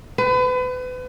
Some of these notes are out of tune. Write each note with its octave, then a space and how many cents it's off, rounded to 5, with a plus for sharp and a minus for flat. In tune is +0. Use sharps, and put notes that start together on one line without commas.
B4 +35